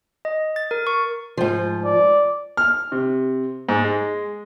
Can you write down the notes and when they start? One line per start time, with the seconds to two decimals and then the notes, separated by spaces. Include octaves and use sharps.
0.25 D#5
0.56 A6
0.71 A#4
0.87 C#6
1.37 G#2 F3
1.85 D5
2.57 F6
2.92 C3
3.69 G#2
3.84 G#3